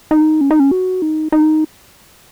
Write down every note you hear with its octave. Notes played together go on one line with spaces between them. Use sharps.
D#4
C#4
D#4
C#4
F#4
D#4
D#4